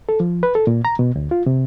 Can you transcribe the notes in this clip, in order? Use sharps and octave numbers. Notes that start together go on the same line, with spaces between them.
A4
F3
B4
A4
A#2
A#5
B2
D2
F4
C3